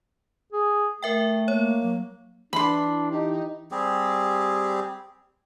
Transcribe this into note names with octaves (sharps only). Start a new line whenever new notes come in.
G#4
A3 A#4 E5 G5
A#3 C#5
F#3
E3 D4 B5 C6
D#4 G4
G3 C4 G4 G#4